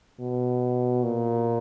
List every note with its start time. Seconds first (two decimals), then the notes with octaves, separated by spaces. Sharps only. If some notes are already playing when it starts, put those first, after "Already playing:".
0.20 B2
1.03 A#2